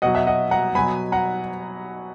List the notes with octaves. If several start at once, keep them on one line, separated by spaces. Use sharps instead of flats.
B2 F#3 D#5 F#5
E5
D#5 F#5
F#5 A#5
B2 F#3 G#5 B5
F#5 A#5